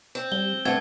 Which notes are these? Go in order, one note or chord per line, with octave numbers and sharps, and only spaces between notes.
C4
G3 G7
G2 A3 C4 F#5 G#6